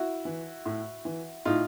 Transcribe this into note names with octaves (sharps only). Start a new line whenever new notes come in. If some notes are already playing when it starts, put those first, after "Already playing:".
Already playing: E4 F#4
E3
A2
E3
A2 D#4 F4